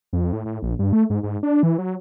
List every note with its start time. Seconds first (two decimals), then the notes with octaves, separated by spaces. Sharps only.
0.13 F2
0.33 A2
0.45 A2
0.62 A#1
0.79 G2
0.93 A3
1.10 G#2
1.23 G#2
1.43 D4
1.63 E3
1.78 F#3